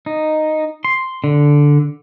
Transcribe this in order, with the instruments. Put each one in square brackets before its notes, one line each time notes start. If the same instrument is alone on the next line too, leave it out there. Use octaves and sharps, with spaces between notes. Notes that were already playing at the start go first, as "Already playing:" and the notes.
[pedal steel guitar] D#4
C6
D3